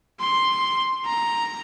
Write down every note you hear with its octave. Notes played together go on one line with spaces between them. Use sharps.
C6
A#5